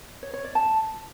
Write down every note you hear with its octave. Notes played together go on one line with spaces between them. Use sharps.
C#5
C#5
D5
A5